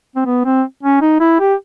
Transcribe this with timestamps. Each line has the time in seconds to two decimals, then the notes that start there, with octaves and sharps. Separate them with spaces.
0.16 C4
0.26 B3
0.45 C4
0.83 C#4
1.02 D#4
1.20 E4
1.40 G4